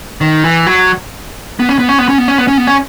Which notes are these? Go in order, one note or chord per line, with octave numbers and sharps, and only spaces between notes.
D#3
E3
F#3
B3
C#4
B3
C#4
B3
C#4
B3
C#4
B3
C#4
B3
C#4